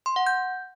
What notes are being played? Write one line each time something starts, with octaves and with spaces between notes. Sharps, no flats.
C6
F#5
G6